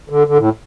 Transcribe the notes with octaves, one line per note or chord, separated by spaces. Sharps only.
D3
D3
A2